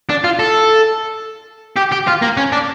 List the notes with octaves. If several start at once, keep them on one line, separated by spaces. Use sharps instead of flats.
D4
F4
A4
G4
G4
F4
A#3
C#4
D4